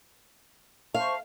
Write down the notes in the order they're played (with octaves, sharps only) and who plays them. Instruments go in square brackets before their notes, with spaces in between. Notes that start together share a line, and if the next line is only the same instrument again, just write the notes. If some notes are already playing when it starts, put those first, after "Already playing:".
[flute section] C5 A5 C#6 [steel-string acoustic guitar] F5